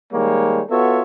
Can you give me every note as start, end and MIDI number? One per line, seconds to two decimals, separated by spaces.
0.13 0.61 51
0.13 0.61 55
0.13 0.61 56
0.13 0.61 58
0.13 0.61 72
0.13 0.61 73
0.70 1.02 59
0.70 1.02 65
0.70 1.02 66
0.70 1.02 69
0.70 1.02 73
0.70 1.02 76